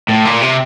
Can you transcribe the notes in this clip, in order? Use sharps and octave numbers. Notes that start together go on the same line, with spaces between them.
A2
A#2
C3